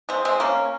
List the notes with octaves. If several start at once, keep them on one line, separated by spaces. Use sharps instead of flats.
G#3 C4
G#3 C4
A#3 C#4